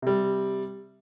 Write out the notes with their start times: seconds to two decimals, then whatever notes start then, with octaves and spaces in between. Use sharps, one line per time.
0.02 C3 G3